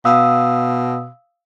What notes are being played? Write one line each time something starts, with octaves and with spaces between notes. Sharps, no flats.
B2 F5 D#6 E6